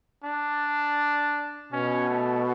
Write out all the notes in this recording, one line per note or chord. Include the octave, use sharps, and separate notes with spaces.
D4
B2 C#4
A3